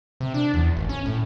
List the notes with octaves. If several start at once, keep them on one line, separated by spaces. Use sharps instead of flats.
C3
D4
E2
G#1
C#4
A2